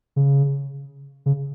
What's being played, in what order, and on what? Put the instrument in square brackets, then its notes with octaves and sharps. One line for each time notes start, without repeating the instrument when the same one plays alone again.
[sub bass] C#3
C#3